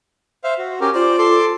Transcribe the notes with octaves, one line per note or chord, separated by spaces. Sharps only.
C5 E5 F5
F#4
C#4 G4 A#4
F4 C5 D5
A4 C6 D6